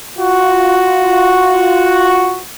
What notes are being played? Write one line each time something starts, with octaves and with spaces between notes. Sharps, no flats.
F4 F#4